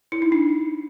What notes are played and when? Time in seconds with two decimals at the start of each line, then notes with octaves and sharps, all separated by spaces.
0.12 E4
0.22 D#4
0.32 D4